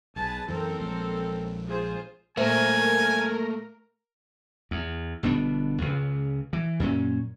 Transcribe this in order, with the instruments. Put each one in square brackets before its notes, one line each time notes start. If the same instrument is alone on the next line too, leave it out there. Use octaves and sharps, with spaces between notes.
[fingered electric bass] B1 [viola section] G#4 B4 A5
[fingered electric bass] F#2 E3 [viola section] C4 A4 A#4
[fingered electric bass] A#1 F3 G#3
[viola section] F4 G#4 C5
[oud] A#2 C5 E5 [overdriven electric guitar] A3 A#3 [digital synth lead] A#4 [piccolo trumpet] G#5
[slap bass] E2
G1 B2 B3 D4
C#2 C#3
E3
F#2 A#2 C#4